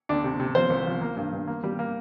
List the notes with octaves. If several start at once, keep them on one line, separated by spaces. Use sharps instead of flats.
D2 D4
C3
C3
F3 C5
C2
F3
A#3
G2
G2
A#3
G3
A#3